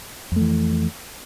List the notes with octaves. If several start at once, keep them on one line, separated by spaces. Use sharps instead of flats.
F2 E3 A3